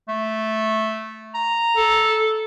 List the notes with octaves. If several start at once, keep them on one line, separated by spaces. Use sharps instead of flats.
A3
A#5
A4